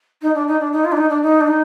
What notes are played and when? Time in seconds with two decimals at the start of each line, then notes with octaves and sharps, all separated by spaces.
0.21 D#4
0.34 D4
0.47 D#4
0.60 D4
0.72 D#4
0.84 F4
0.91 D4
0.97 D#4
1.09 D4
1.22 D#4
1.40 D4
1.47 D#4